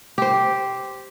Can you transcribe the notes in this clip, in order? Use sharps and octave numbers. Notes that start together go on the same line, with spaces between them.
G4 C5